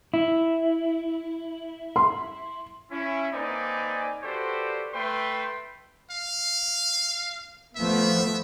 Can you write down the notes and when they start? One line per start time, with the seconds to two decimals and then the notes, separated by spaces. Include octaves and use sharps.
0.14 E4
1.96 C6
2.91 C#4 E4
3.33 A#3 C4 D#4 B4 D5 G#5
4.23 F#4 G4 A4 B4 C5 D5
4.94 A3 B4 G5 B5 C6
6.11 F5
7.76 F3 A3 B3 E5